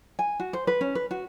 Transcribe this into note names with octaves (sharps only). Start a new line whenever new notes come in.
G#5
F#4
C5
B4
C#4
B4
F#4